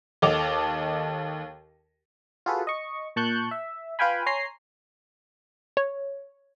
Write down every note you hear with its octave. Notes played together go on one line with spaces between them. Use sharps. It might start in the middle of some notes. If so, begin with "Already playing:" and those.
D#2 A4 D#5 A5 D6 F7
F4 F#4 G#4 A4 B4
D#5 C#6
A#2 A5 C#6 F#6 G6
E5
F4 B4 F5 G5 G#5 B5
C#5 G#5 A#5 C6 C7
C#5